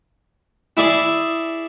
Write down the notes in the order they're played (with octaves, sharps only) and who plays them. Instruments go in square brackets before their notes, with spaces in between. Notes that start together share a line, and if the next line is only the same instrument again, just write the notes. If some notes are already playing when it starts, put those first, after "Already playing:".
[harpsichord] E4 G#4 D5